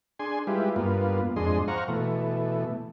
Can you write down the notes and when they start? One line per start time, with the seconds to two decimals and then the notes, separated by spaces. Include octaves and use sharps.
0.19 D4 G#4 G#5 C6
0.47 G3 G#3 E4 F4 G4 B4
0.76 G2 A#3 B3 F4
1.36 F2 G#2 D4 G#4 D#5 C6
1.68 C5 F5 F#5 A#5 C#6
1.88 B2 E3 A3